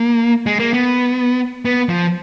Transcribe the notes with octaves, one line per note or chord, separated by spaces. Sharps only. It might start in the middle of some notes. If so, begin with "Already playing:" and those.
Already playing: A#3
G#3
A#3
B3
B3
F3